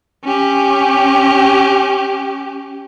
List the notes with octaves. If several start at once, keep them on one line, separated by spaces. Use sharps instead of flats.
C#4 G4